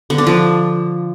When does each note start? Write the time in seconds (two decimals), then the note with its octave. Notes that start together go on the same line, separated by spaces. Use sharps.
0.10 D3
0.18 D4
0.27 F3